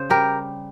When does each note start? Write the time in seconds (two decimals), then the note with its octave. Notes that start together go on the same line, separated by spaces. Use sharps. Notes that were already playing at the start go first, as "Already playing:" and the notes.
Already playing: C#3 C5
0.10 G3 G4 A#4